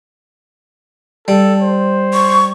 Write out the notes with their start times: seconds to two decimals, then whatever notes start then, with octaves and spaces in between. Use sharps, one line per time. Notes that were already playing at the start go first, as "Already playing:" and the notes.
1.28 G3 A4
1.62 C5
2.14 C#6